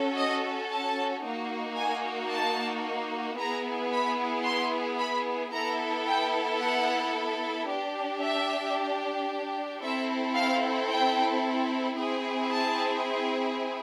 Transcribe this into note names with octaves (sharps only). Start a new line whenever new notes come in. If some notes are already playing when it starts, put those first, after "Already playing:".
Already playing: C#4 F#4 A4
D#5
A5
A#3 D#4 F#4
G#5
A5
B3 E4 G#4 A#5
B5
C6
B5
B3 E4 A4 A#5
G5
F#5
D4 G4
E5
C4 E4 A4 E5
F5
G5
C4 E4 G#4
A5